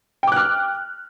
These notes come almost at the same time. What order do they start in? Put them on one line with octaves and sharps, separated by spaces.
G5 D6 F#6 F6